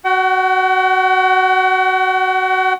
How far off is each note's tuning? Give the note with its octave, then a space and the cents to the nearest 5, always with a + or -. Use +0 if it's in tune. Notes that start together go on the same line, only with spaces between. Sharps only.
F#4 +10 F#5 +45